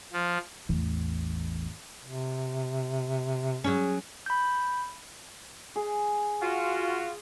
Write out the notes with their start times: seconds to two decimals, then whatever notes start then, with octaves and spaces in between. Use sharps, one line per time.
0.13 F3
0.69 A1 E2
2.04 C3
3.64 F#3 C#4 G#4
4.26 B5 G6
5.76 G#4
6.41 F4 F#4